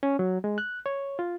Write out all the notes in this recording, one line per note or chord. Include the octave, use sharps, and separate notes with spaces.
C#4
F#3
G#3
F#6
C#5
F4